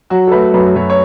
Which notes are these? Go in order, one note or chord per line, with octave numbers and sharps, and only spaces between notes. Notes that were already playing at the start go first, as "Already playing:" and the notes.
F#3 F#4
A4
A3 B4
F#2 B4
F#2 C#5
C#5